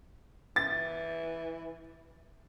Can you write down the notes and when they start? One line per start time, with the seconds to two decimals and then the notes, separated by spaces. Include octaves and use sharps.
0.56 E3 A6